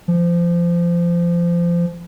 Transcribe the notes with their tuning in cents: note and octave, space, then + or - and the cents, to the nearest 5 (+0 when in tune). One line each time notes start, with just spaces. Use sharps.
F3 -25